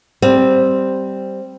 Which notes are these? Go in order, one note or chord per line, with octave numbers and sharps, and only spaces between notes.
G3 C4